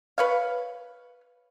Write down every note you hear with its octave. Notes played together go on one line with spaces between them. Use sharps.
B4 C#5 F5